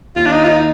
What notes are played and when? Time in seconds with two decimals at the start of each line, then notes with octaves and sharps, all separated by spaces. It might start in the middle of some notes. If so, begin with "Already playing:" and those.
0.16 D#2 F4
0.26 D4
0.32 D#4
0.38 D#2
0.44 F4
0.49 D#4